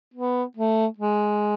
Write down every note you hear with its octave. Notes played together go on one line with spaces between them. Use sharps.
B3
A3
G#3